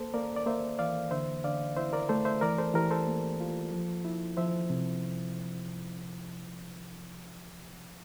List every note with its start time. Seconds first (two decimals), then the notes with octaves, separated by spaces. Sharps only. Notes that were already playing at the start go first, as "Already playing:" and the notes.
Already playing: A#3 A4 C5
0.14 A#3 A#4 D5
0.36 D5
0.46 A#3 C5 E5
0.79 E3 D5 F5
1.11 D3 C5 E5
1.44 D3 D5 F5
1.77 E4 C5 E5
1.93 A#4 D5
2.09 A3 A4 C5
2.25 C5 E5
2.41 E3 A#4 D5
2.58 A4 C5
2.74 E3 G4 A#4
2.91 A4 C5
3.07 A#3
3.40 F4
3.72 F3
4.05 E4
4.37 F3 C5 E5
4.70 C3